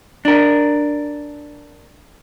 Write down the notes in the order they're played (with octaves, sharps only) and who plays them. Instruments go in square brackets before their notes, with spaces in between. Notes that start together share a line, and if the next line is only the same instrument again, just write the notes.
[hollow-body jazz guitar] D4 A#4